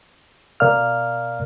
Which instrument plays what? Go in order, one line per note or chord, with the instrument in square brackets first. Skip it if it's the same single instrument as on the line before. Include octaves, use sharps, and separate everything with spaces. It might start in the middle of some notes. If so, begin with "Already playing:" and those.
[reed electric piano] B2 A#4 D5 F5 F6